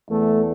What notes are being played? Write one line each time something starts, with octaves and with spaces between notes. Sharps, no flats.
E2 A3